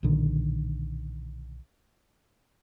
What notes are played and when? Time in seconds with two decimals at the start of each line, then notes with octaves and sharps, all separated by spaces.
0.03 B1 A#2 D3 D#3